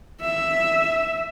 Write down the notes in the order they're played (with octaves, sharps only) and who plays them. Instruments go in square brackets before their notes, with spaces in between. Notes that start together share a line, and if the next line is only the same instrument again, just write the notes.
[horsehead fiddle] E5